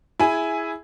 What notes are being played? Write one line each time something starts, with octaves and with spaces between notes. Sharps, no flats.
E4 G#4 G#5